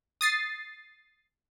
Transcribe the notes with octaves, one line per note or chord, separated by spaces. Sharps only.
D#6 A6 C7